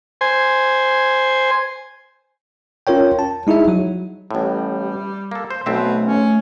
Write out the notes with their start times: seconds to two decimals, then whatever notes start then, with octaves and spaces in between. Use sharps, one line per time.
0.21 C5 G#5
2.87 C#4 F4 A#4 C#5 G5
3.19 A5
3.47 G#3 D#4 E4 G#4 E5
3.68 F#3 F#4
4.31 A1 A2 G3
5.31 A#3 A4
5.50 C5
5.66 B1 B2 A3 C4 E5
6.00 C#4